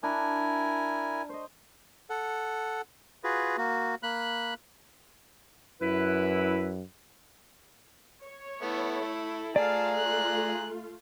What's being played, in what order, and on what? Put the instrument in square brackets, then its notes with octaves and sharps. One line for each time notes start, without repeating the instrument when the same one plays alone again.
[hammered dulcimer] D4 [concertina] E4 A#4 G#5
[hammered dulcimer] C5 D#5
[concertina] A4 F#5
F4 F#4 G#4 B4
A#3 F#4
A#3 B5 F#6
[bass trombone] F#2 [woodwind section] E4 B4
[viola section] C#5
[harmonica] A3 B3 [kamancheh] E4 A4
[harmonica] A3
[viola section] A3 F4 [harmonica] G#4 A#5 [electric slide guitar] D5 [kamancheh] F5 A5
[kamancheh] F#6